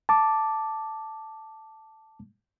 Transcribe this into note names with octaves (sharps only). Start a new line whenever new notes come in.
A5 D6